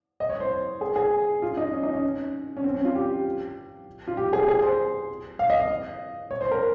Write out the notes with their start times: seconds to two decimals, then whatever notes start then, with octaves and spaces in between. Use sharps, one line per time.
0.20 D#5
0.30 C#5
0.40 C5
0.81 G#4
0.96 G#4
1.42 F4
1.57 D#4
1.73 C#4
1.83 D#4
1.93 C#4
2.57 C#4
2.64 C4
2.74 C#4
2.85 F4
2.95 G4
4.08 F4
4.17 G4
4.33 G#4
4.48 G#4
4.62 C5
5.39 F5
5.50 D#5
5.60 D#5
6.31 C#5
6.41 C5
6.51 A#4